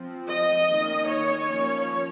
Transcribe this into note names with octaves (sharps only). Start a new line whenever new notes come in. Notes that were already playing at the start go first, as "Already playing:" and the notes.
Already playing: F3 C4
D#5
D#3 A#3 C#4
C#5
F3 A#3 C#4